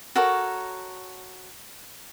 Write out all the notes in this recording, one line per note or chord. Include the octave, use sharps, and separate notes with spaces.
F#4 A4 A#4 C#5